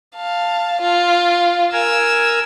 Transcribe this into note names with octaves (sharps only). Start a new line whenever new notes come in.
F5 A5
F4
A#4 G#5 E6